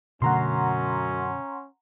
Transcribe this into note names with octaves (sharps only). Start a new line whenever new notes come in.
F#2 B2 D3 A3 C#4 F#5 A#5 C6